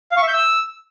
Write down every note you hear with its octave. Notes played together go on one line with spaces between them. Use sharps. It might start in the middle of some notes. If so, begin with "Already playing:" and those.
F5
C#6
E5
G6
E6